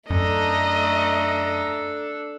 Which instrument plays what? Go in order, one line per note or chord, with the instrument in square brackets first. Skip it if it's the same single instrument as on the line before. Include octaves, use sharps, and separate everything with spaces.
[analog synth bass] F#2 [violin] A3 A#5 [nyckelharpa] D4 A4 [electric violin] D#5